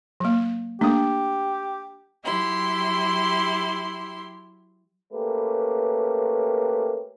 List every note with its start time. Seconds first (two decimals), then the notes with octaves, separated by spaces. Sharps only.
0.20 F#3 A#3
0.81 A3 A#3 D4 G4 D#6
2.24 F#3 E4 G4 C6
5.13 A3 A#3 C#4 G4 B4